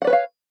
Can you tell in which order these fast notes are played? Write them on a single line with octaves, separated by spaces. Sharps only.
F#5 D5 B4 C#5 F5